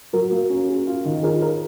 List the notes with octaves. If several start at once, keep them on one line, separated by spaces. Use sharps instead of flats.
F#3 F#4 A#4
A#3
C#4
G#4
F4
D#3
F4 G#4 A#4
A#4